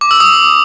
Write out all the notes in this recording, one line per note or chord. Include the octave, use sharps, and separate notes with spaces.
D6
E6
D#6